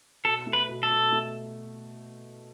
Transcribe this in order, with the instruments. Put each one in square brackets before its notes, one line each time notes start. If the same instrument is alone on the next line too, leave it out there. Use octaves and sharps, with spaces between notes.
[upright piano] B2 [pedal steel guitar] A4
[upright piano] A3
[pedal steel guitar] B4
[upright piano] B2
[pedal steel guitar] A4
[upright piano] B2
A3